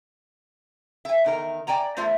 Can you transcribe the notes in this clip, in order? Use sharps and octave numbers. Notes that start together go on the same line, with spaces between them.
E5 G#5
E2 D#3 A#4
D5 G5 G#5 A#5
E2 A3 F4 C5 E5